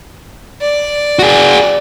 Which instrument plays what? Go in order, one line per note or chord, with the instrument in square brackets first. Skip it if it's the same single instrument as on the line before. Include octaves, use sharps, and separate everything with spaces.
[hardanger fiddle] D5
[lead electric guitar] F#4 G#4